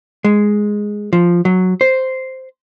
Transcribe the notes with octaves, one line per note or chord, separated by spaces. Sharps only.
G#3
F3
F#3
C5